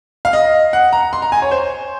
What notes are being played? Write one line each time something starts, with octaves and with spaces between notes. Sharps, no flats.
F5
D#5
F#5
A#5
C6
A#5
G#5
C#5
C5